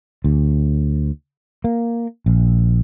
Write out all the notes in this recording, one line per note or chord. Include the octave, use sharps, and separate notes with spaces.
D2
A#3
A#1